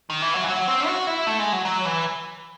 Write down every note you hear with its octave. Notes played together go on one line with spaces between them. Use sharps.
D#3
E3
F#3
E3
F#3
C4
F#4
E4
A3
G#3
F#3
F#3
E3